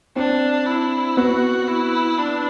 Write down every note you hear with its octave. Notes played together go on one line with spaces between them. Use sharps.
C4 D4
E4
B3 F#4
E4
D4